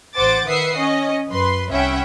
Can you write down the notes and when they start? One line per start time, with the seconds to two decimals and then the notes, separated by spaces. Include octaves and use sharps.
0.16 A1 C5 F#5 D6 A6
0.47 D#3 B4 E5 F#5 D#6 C7
0.77 C#4 D#5
1.30 F#2 B4 C6
1.71 C2 C#4 E5 F#5 G5 B5